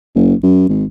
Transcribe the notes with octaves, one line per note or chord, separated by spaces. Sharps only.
F#1
F#2
G#1